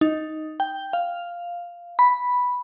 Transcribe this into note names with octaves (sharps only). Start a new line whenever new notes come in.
D#4
G5
F5
B5